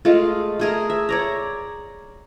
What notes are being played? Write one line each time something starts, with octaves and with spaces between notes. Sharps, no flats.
G#3 A3 F4
A3 G#4 A#4
E5
C#5 D5 A#5